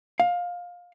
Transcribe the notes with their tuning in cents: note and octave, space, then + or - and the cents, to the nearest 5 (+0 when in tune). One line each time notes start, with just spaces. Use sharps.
F5 +20